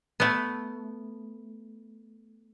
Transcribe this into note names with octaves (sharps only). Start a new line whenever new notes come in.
A3 B3